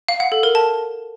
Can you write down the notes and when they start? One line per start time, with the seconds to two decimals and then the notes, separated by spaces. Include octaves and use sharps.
0.08 F5
0.20 F#5
0.32 A4
0.43 A#4
0.55 A5